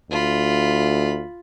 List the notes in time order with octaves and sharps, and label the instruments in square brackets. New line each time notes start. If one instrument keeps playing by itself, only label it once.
[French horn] D2 [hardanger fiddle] F4 B5